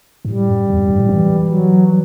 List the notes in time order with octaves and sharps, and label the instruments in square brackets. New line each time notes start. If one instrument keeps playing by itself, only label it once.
[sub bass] G2
[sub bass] A2 [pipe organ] G3
[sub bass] F#2
E2
F#2
G2
A2
E3
[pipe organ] F#3